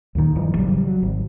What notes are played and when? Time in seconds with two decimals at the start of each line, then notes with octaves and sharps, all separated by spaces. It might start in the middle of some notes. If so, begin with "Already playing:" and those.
0.15 D#2 A#2 D#3
0.36 D#1 G2 E3 F3
0.57 G#1 C#3 F#3 G3
0.87 F#3
1.03 G#1